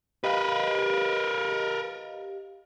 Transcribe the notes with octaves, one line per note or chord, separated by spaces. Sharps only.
G4 A#4 B4 D#5 F5